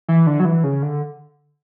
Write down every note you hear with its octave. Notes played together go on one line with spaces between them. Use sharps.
E3
D3
F#3
E3
C#3
D3